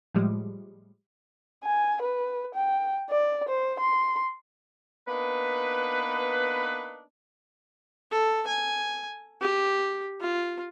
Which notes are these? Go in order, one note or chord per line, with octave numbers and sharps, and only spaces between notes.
A2 F3 G3 G#3
G#5
B4
G5
D5
C5
C6
A#3 B3 D4 D#4 B4
A4
G#5
G4
F4